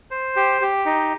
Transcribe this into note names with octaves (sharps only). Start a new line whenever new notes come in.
C5
G4
G4
D#4